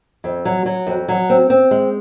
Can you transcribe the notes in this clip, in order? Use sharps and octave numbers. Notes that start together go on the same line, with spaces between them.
F2
F#3
F#3
F2
F#3
C4
C4
G#3